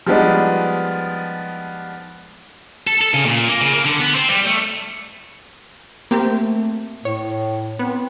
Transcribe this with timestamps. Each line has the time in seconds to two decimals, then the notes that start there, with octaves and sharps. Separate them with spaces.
0.07 F3 G3 G#3 B3 D4 D#4
2.87 A4
3.01 A4
3.14 C#3
3.26 A#2
3.49 A#3
3.61 C#3
3.73 A#3
3.85 D3
4.00 B3
4.15 C4
4.29 G3
4.47 A3
6.11 A3 A#3 C4 G4
7.05 A2 C#5
7.79 B3 C4